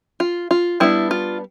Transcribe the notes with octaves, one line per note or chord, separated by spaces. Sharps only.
F4
F4
G3 B3 D4 E4
F4